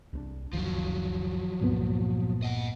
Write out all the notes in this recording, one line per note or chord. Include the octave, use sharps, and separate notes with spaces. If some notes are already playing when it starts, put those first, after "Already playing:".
C2 C4 D4
F#1 C#2 D#3 F3 F#3
C#2 G2 A#2 B3
D#5 F#5